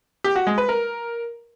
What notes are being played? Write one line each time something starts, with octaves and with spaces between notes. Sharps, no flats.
G4
F#4
G#3
B4
A#4